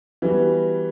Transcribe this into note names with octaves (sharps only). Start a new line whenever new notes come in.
E3 G3 B3 F#4